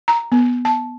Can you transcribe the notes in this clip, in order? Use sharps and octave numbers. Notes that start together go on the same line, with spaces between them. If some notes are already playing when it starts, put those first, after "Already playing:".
A#5
B3
A5